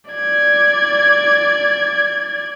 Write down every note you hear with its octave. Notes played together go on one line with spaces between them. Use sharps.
D5 G#6